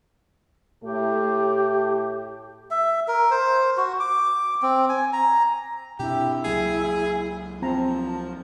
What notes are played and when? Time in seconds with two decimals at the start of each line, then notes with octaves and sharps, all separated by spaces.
0.84 A2 A3 G4
2.71 E5
3.08 A#4
3.31 C5
3.77 F#4
4.00 D6
4.62 C4
4.89 G#5
5.13 A#5
5.99 B2 C4 D4 E4 G4
6.45 C#2 F#3 A#3 G#4
7.62 F3 C4 A5 A#5